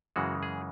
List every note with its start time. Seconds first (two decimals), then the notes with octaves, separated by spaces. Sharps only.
0.16 F#2 C#3 E3 G#3 F#4
0.43 G#4